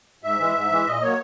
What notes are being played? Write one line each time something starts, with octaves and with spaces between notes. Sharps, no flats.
G#2 E5
E3 G#3
G#2
E3 G#3
A#2 D#5
F#3 A#3 C#5